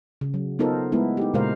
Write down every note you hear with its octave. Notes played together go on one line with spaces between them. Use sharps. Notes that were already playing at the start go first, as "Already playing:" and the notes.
C#3
F#3
B3 D#4 F4 A4 A#4 C5
G#3 A3 B3 E4
D#4 G4
A#2 C#3 G#3 A#4 C5 F5